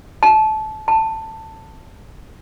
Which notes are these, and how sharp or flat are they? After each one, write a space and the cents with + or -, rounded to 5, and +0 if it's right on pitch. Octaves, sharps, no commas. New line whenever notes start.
A5 -20
A5 +10